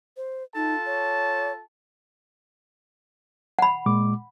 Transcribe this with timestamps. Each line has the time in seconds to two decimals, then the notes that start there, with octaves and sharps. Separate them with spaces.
0.17 C5
0.55 D#4 F4 A4 A5
0.86 C#5
3.59 F#5 B5
3.86 A#2 G#3 D6